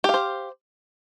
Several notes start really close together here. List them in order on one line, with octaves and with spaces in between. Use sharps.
G4 F5 C5